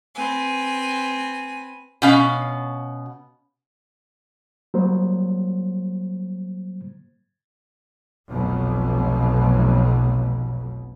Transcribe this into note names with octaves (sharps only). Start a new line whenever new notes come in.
C4 B4 G#5
B2 C#4 F5
F#3 G3 A#3 C5
F1 B1 F2 B2